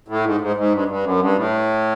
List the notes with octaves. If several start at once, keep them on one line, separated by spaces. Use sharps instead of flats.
A2
G#2
G#2
G#2
G2
G2
F#2
G2
A2